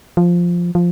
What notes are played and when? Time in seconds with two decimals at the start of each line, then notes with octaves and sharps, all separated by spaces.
0.17 F3
0.75 F3